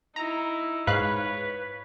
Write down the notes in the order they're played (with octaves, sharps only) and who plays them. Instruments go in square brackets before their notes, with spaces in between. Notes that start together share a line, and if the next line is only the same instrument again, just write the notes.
[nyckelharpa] D#4 E4 [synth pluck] A#5
[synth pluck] G#2 F5 F#6 [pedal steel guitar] B4 [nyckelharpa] C#5